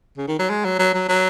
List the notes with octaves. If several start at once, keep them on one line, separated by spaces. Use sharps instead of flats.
C#3
D#3
F#3
G#3
F#3
F#3
F#3
F#3